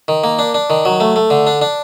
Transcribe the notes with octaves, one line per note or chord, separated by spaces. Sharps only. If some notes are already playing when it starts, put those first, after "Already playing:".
D#3
A#3
D4
D4
D#3
F#3
A3
A3
D3
D4
D4